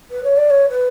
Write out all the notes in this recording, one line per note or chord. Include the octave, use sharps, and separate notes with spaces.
B4
C#5
D5
C#5
B4